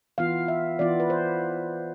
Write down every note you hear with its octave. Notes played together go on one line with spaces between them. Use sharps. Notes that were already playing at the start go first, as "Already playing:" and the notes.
E3 B3 F4 F5
E5
E3 B3 F4 D5
B4
C5